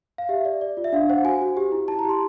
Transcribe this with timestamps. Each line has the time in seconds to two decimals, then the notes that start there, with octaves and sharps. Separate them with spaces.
0.18 F5
0.29 G4 E5
0.45 D5
0.61 D5
0.77 F4
0.84 E5
0.93 D4 F5
1.10 C5 F#5
1.24 F#4 G#5
1.41 F#4
1.57 G4
1.72 E4
1.88 E4 A5
1.99 A#5
2.04 G4
2.09 C6